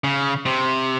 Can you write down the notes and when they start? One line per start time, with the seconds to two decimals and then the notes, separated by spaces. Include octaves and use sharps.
0.04 C#3
0.46 C3